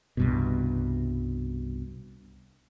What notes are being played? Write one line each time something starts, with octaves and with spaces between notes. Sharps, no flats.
C2 G2 B2